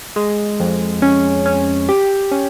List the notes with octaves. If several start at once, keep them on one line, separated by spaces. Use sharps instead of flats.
G#3
F2
C#4
C#4
G4
C#4